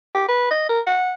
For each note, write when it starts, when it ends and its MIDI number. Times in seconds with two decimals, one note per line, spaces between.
0.15 0.26 67
0.28 0.49 71
0.51 0.66 75
0.69 0.81 70
0.87 1.12 78